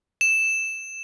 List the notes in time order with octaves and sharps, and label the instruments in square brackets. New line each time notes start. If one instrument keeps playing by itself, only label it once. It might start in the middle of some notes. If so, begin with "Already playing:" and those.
[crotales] E7